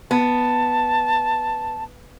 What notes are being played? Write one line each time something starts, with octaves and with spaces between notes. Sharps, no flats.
B3 A5